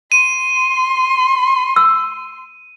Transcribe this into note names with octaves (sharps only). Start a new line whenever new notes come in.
C6 D#7
E6